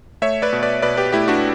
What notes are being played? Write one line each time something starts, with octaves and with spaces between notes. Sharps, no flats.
A3 C#5 E5
B4 D5
B2
B4 D5
B2 B4 D5
G4 B4
A3 E4 G4
D4 F#4